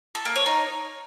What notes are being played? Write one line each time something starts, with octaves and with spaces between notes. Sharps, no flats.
A4
A#3
C#5
D#4